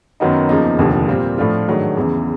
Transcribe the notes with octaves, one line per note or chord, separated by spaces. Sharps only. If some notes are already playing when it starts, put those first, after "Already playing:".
F#2 D#3 F#3 B3 D#4
E2 C#3 F3 A#3 D#4
F1 D#2 D3 F3
A#2 G3 C4 F4
A2 F3 A3 D4 F4
G#2 D#3 F#3 A3 D4
E2 C#3 E3